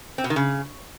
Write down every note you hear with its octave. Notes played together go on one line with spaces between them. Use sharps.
C4
B2
D#3
C#3